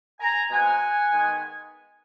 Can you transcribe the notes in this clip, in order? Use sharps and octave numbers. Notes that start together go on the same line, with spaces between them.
G#5 A#5
B2 G#3 C4 F#5 G#5
D#3 G#3 B3